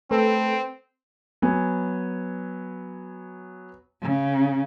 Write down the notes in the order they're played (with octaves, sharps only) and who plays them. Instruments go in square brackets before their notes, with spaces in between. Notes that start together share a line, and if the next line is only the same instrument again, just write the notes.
[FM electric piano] A3 A4 B4 [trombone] C4
[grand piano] F#3 B3 G#5
[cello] C#3